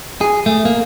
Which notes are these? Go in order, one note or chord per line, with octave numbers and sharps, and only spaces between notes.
G#4
A3
A#3